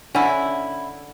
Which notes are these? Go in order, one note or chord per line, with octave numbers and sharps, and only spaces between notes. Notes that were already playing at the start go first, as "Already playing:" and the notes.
D3 C#4 E4